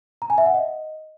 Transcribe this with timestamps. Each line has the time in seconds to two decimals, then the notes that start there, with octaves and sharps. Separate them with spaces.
0.22 A#5
0.30 G#5
0.38 E5
0.46 F#5
0.54 D#5